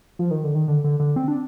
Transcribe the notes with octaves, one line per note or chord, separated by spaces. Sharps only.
F3
D#3
D3
D#3
D3
D3
D3
C4
D4